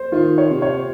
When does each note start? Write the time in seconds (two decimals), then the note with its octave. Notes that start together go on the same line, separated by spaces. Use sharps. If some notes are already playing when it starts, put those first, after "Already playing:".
Already playing: C5
0.12 D#3 F4
0.38 C#5
0.50 C3
0.62 C#5